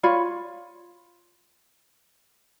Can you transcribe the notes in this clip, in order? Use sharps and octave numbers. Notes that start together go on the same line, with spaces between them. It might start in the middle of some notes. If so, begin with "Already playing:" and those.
F4 C#5 D5 B5